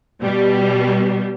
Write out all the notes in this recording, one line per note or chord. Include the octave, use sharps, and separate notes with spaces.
B2 G3